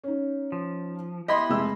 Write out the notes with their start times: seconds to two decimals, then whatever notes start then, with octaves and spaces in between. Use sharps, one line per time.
0.04 C#4 D#4
0.52 F3
1.28 B3 E4 G4 D#5 B5 C6
1.50 F1 G#3 E6